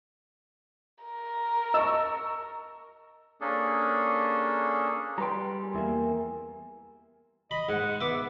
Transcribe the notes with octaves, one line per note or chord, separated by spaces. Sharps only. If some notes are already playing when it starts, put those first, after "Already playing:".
A#4
D#5 A5 C#6 E6
A#3 C#4 D4 G#4 A4
G3 B4 G5 A#5 C6
G#4 A#4
E2 A#3 E5
D#5 B5
G#2 F#5
B3 E5 D6